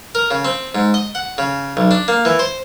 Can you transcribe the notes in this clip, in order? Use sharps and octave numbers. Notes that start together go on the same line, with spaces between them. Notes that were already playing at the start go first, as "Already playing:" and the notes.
A#4
C#3
C4
G#2
D#5
F#5
C#3
B1
D4
A#3
E3
C5